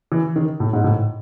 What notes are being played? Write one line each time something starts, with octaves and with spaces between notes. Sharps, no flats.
E3
D#3
A2
G#2
A2